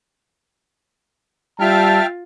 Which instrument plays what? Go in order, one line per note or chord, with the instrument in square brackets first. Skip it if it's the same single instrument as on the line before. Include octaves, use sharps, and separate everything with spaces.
[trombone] G3 [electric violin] F4 A6 [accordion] E5 G5 F6 [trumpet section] A5